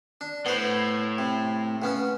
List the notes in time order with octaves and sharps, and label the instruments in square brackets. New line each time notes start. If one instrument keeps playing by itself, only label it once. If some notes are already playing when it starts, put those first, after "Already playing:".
[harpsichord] D4
[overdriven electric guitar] A2 [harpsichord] B3 C5
[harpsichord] C3
C#3 B3 C#4